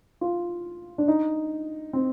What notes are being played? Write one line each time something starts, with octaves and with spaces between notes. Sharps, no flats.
F4
D4
D#4
C4